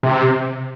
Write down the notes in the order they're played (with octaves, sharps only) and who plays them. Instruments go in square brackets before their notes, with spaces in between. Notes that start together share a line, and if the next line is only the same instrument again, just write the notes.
[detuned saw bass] C3